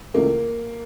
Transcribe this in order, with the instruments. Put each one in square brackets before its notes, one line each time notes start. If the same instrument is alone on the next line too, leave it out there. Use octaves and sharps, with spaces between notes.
[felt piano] C#2 C#3 E3 A3 [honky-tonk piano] A#3